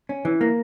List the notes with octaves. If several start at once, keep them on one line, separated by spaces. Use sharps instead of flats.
C#4
E3
A#3